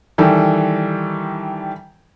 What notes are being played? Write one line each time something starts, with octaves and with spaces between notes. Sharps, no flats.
D#3 E3 G3 A4